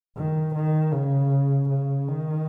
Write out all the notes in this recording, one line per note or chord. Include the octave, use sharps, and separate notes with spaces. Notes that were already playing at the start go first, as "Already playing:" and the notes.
D#3
D#3
C#3
C#3
D#3